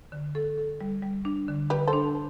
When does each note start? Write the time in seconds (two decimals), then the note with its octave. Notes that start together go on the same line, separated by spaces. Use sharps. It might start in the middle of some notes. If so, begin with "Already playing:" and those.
0.12 D3
0.35 A4
0.58 A4
0.81 G3
1.03 G3
1.25 D4
1.48 D3
1.70 D3 G4 B4
1.87 A4 C5
1.93 D4